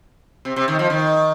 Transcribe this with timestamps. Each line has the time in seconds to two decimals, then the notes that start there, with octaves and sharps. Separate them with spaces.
0.45 C3
0.56 C3
0.68 D#3
0.79 F3
0.90 D#3